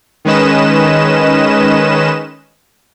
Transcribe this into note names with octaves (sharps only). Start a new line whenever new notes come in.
D#3 G#3 C#4 B4 D#5 E7